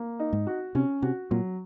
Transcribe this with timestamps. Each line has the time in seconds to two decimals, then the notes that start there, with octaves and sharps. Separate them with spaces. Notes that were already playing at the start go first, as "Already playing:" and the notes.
Already playing: A#3
0.20 D#4
0.33 G#2
0.47 F#4
0.75 C3 C#4
1.02 C3 F#4
1.31 A#2 F#3